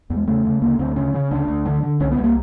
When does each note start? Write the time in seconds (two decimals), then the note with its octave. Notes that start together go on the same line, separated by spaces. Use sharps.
0.10 E2
0.16 G#3
0.27 C#3 A3
0.44 C#3
0.61 D2 A#3
0.79 D2 C4
0.96 C#3 C#4
1.14 C#3
1.31 D2 D4
1.48 D2
1.65 D3
1.83 D3
2.00 C2 C#4
2.11 B3
2.18 C2
2.24 A#3